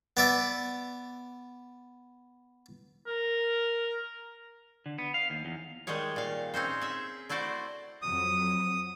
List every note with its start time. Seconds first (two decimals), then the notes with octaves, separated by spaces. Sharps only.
0.17 B3 D5 E5
3.07 A#4
4.86 D3
4.98 B3
5.14 F5
5.30 D#2
5.45 E2
5.87 D#3 G3 G#3 G#4 C#5
6.16 A#2 F5
6.54 C4 C#4 D#4 C5
6.81 G#4 E5
7.29 A3 E4 F#4 C5 D5
8.02 F2 F#3 D#6